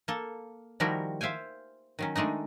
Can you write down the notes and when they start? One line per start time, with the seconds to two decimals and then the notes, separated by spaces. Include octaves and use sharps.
0.08 A#3 A4
0.80 D#3 F3 G3 E4 F#4 A#4
1.21 C5 E5 F5 G5 G#5
1.99 D#3 F#3 C#4
2.16 D#3 G#3 A3 D4 D#4